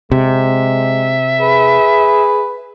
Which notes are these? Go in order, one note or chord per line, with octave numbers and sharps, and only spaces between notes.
C3 G#3 E5
G#4 B4